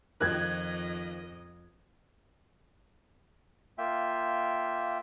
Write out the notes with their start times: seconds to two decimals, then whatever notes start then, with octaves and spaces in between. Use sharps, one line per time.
0.21 F2 D#3 F3 D#5 F#6 G#6
3.78 A#3 F4 E5 G5